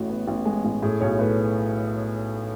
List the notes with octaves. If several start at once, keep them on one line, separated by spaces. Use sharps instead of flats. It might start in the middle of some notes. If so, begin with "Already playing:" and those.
Already playing: A1 A2 F#4
B3
A1
G#3
A1
A2 G#4
B1 C#5
A2 B4